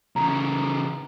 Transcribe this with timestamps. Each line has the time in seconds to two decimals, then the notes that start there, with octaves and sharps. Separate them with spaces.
0.16 C#3 E3 A#5